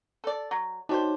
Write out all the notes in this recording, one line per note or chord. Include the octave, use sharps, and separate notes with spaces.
A4 D5
F#3
D4 D#4 F#4 G4 C5 C#5